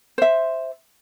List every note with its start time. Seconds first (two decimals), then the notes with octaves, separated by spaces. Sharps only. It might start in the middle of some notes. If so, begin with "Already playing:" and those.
0.18 C5 E5